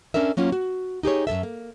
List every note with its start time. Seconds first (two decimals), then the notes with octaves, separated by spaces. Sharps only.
0.14 C#4 D4 A4 A#4 E5
0.37 F#3 A#3 C#4 F4
0.52 F#4
1.03 D#4 G4 G#4 C#5
1.27 F#2 B2 A4 E5
1.43 A#3